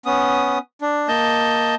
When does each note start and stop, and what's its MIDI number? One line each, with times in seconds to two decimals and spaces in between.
0.06 0.58 59
0.06 0.58 61
0.06 0.58 87
0.81 1.08 62
1.08 1.75 58
1.08 1.75 75
1.08 1.75 81
1.08 1.75 91